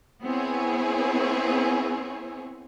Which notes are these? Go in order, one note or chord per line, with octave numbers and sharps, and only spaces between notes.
B3 C4 E4 G#4 C#5